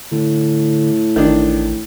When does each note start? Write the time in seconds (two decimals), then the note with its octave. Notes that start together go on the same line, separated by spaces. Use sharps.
0.12 A2 D3
1.16 A1 D#3 D4